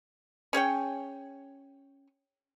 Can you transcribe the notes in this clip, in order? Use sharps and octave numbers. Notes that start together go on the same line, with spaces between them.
C#4 G#4 C#5 G5